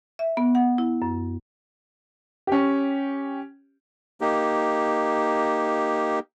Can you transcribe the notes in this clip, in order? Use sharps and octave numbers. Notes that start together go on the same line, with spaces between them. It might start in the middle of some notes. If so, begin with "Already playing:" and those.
E5
B3
F#5
E4
F#2
C#4 G4
A#3 D#4 G4